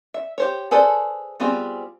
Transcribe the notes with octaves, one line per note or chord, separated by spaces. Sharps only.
E5
G4 C5 C#5
G#4 A4 B4 C5 D5
G3 B3 C4 F4 G#4